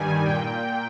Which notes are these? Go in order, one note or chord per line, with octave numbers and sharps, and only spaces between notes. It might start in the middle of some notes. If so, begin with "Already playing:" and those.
Already playing: G2 D#3 G3 G#5
A#2 G5